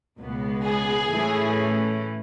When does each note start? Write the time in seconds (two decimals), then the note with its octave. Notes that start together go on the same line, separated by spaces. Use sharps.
0.18 C#2 B2 G#3 B3
0.64 G#4
1.10 A2 E3 A3 C#4